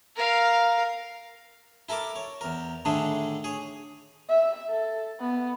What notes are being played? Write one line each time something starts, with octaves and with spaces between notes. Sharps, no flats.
A#4 F5
E4 A4 A#4 A5 D6
C#5
E2 A#4
A2 D3 D#3 A3 D4 G#4
G#4 C#5
E5
A4
B3